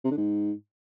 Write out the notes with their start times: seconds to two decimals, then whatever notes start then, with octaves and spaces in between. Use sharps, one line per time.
0.04 C3
0.11 D3
0.17 G#2